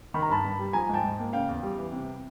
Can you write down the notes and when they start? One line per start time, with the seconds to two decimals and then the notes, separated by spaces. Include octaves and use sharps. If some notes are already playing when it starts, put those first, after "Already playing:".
0.14 D#3 B5
0.22 A#5
0.29 G2 A5 B5
0.45 G2
0.59 G3
0.73 F3 G#5 A#5
0.89 G#2 G5 A5
1.04 G#2
1.19 A#3
1.33 C#3 F5 G5
1.49 E2
1.63 G3
1.78 E3
1.92 C3